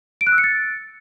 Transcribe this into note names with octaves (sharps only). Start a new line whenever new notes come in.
D7
F#6
E6
C#7
A6